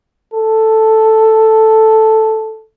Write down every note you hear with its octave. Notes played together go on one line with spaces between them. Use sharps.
A4